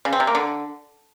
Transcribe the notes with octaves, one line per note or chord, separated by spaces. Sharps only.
C#3
C4
C3
A#3
D3